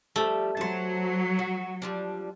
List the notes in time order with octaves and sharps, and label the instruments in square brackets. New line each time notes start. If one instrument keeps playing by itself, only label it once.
[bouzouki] F3 G3 [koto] A3
[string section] F#3 [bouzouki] C5 A5
[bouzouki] F#4
F3 G3 D4